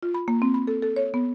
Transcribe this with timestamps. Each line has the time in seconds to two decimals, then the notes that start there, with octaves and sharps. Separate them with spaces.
0.03 F4
0.14 B5
0.28 A#3
0.42 C4
0.54 B5
0.67 A4
0.83 A4
0.96 C#5
1.14 B3